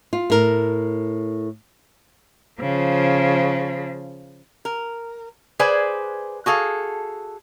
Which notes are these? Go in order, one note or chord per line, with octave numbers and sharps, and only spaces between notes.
F4
A2 A#4
C#3 F3
A#4
G#4 B4 C5 D5 G#5
F#4 G#4 A4 F5